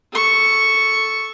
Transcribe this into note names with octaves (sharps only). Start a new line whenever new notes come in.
A4 C#6